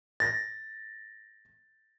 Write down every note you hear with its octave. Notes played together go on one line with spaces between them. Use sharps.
A6 A#6